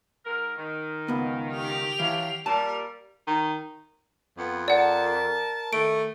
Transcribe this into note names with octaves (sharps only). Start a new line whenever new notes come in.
G#2 A#4
D#3
C#2 B3
G4 F7
G2 E3 F#3 F5
A#2 G3 A#4 A5
D#3
F2 B3
A#4 D5 F#5 A5
D#3 A3 D7